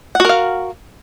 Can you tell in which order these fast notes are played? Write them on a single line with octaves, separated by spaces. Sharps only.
F#5 F#4 A#4 F5